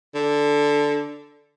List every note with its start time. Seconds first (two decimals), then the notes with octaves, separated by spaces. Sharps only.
0.15 D3